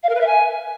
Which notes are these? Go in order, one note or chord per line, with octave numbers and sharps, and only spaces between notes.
F5
A#4
B4
E5
G#5